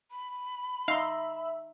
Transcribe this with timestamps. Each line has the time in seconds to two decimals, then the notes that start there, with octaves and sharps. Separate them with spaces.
0.11 B5
0.88 D#4 E5 F5 C6